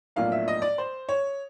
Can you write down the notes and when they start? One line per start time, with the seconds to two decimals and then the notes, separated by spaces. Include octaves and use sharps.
0.16 B1 A2 F3 A#3 D4 F5
0.32 E5
0.48 D#5
0.62 D5
0.78 C5
1.09 C#5